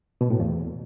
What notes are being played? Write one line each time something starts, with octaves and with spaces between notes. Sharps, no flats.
B2
A2
E2